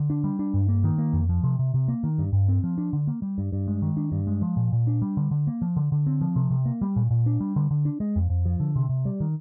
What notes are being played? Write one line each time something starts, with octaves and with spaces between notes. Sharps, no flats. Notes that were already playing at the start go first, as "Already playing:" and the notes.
Already playing: D3
D4
G3
D4
G2
A#3
D#3
A#3
F2
F3
C3
C3
C3
A#3
D#3
G2
G2
C4
F3
D4
D3
A#3
G3
G2
G2
G#3
D#3
D4
G2
G#3
F3
A#2
A#2
D4
G3
D3
D3
A#3
F3
D3
D3
C4
F3
C3
C3
A#3
G3
A#2
A#2
D4
G3
D3
D3
D4
G#3
F2
F2
F3
D3
C3
C3
G3
D#3